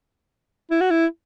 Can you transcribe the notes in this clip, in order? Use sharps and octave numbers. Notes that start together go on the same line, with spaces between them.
E4
F#4
E4